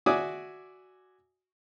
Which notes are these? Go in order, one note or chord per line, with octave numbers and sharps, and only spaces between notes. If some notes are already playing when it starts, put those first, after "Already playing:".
F#4 D5 E5 G#5 D6 D#6